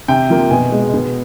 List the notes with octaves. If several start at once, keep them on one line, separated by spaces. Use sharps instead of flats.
C3 G5
F3 A#3
B2 G#5
G#3
B2